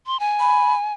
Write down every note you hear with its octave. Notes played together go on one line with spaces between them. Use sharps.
C6
G#5
B5